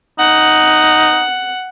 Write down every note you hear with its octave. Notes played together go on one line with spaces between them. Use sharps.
D#4 F#5